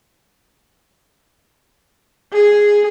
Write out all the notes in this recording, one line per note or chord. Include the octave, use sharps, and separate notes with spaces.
G#4